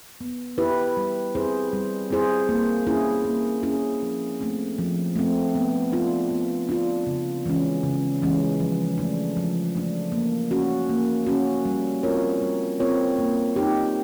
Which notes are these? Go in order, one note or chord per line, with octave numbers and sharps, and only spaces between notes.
B3
E4 G4 B4
G3
C4 E4 G#4 C5
G3
C4 E4 G#4 C5
A#3
C#4 E4 G#4
A#3
C#4 E4 G#4
F3
A3 C4
F3
A3 C4
B3
D4 F4
B3
D4 F4
C#3
E3 G#3 C#4
C#3
E3 G#3 C#4
F3
A3 D4
F3
A3 D4
A#3
C#4 F#4
A#3
C#4 F#4
G3
C4 F4 A#4 C#5
G3
C4 F4 A#4 C#5
A#3
D#4 G4